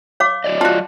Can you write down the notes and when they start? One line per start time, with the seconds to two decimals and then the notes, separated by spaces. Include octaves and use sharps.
0.20 C#5 F5 D6
0.44 F#3 D5 D#5
0.61 F4 F#4 A5